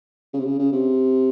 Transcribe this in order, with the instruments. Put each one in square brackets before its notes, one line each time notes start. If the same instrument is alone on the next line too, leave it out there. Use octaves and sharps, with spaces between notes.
[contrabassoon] C#3
C3
C#3
C#3
C3